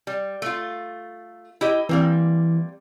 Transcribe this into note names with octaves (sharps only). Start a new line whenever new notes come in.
G3
A3 F4
E4 G4 D#5
E3 G3 A#3 C4